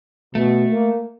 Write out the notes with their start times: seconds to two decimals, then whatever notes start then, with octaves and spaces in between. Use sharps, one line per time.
0.35 B2 A3
0.71 A#3